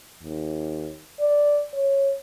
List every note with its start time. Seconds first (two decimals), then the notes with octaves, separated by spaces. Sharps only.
0.23 D#2
1.20 D5
1.73 C#5